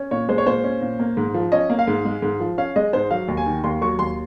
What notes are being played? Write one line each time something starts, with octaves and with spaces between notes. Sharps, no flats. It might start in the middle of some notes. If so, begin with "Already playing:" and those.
Already playing: C#4
A#2 C#5
G#3 C5
C#5
A#2 C5
C#4
A#2
A#3
G#2
F3
C#4 D#5
A#3
F5
G#2
G#3
G#2
F3
C#4 F5
G#3 D#5
G#2 C5
F#3 F5
D#2
G#5
D#3
D#2 C6
F#3 C#6
D#2 C6